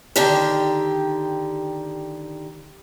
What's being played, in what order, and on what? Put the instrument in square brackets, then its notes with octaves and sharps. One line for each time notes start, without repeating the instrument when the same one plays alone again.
[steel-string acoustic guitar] D3 D#3 G4